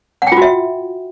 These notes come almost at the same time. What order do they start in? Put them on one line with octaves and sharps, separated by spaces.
F#5 G5 F4 F#4 E5